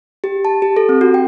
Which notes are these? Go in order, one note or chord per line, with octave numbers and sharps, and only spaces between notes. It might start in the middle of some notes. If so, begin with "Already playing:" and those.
G4
A5
G4
A4
C4
F#4
G5